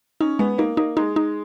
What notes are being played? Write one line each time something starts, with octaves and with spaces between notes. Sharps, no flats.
C#4 D#4
G#3 B3
A#3 D#4
A#3 D#4
G#3 D#4
D#4